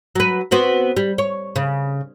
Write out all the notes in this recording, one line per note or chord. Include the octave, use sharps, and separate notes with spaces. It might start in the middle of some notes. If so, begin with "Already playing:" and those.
F#3 B4
B3 C4 F#4
G3
C#5
C#3